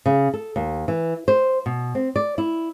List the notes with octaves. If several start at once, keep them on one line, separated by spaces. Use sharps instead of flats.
C#3
A4
D#2
E3
C5
B2
C4
D5
E4